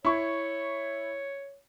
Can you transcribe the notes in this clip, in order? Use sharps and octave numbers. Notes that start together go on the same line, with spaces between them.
E4 C#5 C#6